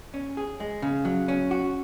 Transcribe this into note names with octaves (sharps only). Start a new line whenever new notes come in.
C#4
G#4
G#3
C#3
F#3
C#4
F#4